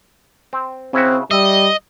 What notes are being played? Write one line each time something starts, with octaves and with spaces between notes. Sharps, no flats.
C4
C#3 C4 E4 F#4
G3 D#5 E5